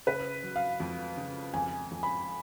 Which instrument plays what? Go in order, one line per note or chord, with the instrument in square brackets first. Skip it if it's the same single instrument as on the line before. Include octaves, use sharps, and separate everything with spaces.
[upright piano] C#3 [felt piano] B4
[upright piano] F#3
[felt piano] F5
[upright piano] F2
C#3
[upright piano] F2 [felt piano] G#5
[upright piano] F2
[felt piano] B5